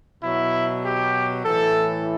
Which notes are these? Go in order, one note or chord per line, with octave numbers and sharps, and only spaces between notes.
B2 F#3 E4
G4
A2 E3 A4